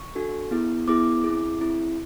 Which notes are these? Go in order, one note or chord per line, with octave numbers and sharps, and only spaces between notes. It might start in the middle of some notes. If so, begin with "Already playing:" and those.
Already playing: C#6
D4 F#4 A4
B3 E4 G#4
B3 E4 G#4 D6
C4 E4 G#4
C4 E4 G#4